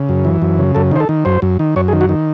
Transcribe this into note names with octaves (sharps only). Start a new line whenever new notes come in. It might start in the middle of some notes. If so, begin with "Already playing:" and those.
Already playing: C#3
F#2
E3
F#2
C#3
F#2 A4
D#3 C5
A4
D#3
F#2 C5
F#2
D#3
F#2 C#5
G#4
D#3
F#4
D#3